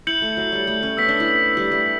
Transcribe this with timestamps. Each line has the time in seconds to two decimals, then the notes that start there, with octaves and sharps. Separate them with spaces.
0.07 E4 G6 C#7 F#7
0.22 A3
0.37 F#3
0.52 G3
0.67 A3
0.83 C#4
0.97 B3 E6 G6 B6
1.09 D4
1.20 E4
1.57 G3
1.72 A3